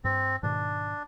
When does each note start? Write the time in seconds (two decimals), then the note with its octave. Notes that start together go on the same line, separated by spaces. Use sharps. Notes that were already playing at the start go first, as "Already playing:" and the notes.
0.04 G2 C4
0.43 G#2 B2 D#3 D4